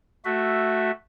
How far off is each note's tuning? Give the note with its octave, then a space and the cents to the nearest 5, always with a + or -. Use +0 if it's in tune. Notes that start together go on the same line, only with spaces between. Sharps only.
A3 +0 F#4 +0 E5 +0